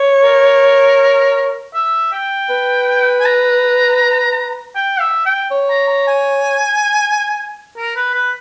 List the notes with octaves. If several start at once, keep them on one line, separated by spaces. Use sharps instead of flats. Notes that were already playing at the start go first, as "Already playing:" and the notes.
Already playing: C#5
A#4
E5
G5
B4
G#5
A#5
G5
E5
G5
C#5
A#5
A#5
G#5
A#4
B4
B4